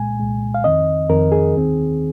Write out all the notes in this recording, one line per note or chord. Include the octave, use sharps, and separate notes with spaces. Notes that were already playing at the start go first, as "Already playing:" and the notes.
Already playing: C2 A#2 G#3 G#5
C2 A#2 G#3
F5
F2 D#3 C4 D#5
F2 D#3 C4 A#4
G#4
D#2 D#3 C4